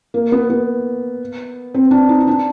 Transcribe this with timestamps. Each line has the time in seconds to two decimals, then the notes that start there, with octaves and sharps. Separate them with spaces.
0.14 A#3
0.32 B3
0.50 B3
1.74 C4
1.91 D4
2.09 D#4
2.20 D#4
2.27 D4